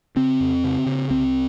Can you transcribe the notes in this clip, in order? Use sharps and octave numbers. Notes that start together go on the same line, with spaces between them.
C#3 C4
F2
C#3
C#3
C2 C4